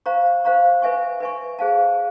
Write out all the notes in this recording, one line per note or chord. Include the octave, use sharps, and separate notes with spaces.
C5 F5 A#5 C#6
C5 F5 A#5 C#6
B4 E5 G#5 C#6
B4 E5 G#5 C#6
G#4 C5 F5 A5